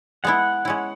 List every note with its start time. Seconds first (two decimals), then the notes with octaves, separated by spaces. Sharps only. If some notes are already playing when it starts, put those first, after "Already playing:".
0.24 G#3 B3 E4 F#5
0.65 G#3 C#4 E4